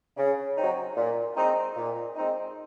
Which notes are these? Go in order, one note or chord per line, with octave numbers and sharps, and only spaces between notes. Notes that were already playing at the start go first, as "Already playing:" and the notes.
C#3
F#3 C4 D#4
A#2
G#3 C4 D#4
A#2
G#3 C4 D#4